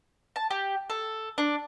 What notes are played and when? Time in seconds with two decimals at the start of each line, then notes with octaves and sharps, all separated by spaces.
0.36 A5
0.51 G4
0.90 A4
1.38 D4